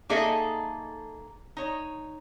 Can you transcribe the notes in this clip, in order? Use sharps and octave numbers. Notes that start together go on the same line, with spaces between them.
A#3 D#4 G#4 A4 D#5 E5
D#4 C#5